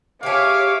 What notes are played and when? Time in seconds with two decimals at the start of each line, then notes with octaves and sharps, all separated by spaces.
0.23 G4 G#4 C#5 E5 F5 D6